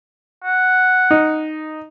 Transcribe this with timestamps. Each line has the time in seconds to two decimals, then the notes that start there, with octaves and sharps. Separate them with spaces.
0.44 F#5
1.11 D#4